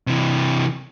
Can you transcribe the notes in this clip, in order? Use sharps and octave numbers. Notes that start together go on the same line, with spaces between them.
C3 E3